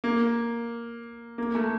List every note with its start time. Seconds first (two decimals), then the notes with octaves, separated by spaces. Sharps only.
0.04 A#3
1.38 A#3
1.55 A3